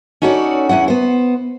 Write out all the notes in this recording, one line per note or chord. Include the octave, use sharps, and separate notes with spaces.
C#4 D#4 F#4 A4 C#5 D5
E2 C#4 E4 F#5
B3 C5